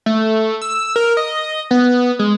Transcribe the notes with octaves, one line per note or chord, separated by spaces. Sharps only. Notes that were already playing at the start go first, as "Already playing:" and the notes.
A3
E6
A#4
D#5
B3
G#3